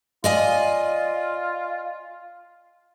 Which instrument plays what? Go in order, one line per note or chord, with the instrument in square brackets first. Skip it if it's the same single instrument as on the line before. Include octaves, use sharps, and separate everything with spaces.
[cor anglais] F4 [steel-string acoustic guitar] D5 D#5 G#5